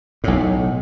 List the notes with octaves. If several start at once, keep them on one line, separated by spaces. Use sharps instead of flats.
B1 A2